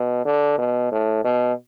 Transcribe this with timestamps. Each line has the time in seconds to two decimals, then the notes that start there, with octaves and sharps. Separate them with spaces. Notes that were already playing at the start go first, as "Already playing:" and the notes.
Already playing: B2
0.25 D3
0.58 B2
0.92 A2
1.24 B2